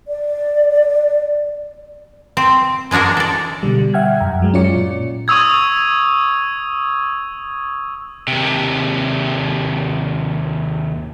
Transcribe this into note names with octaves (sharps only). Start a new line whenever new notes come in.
D5
C4
E3 G#3 D4 F#4 A#4
A4 D5
B2 D3 G3
E5 F#5 G5 F6 G#6
F#2 G5 A#5
F#2 F#3 G#3
C#4 F4 C#5 D5 C#7
A#2
C#6 D#6 E6 G#6
D#2 C3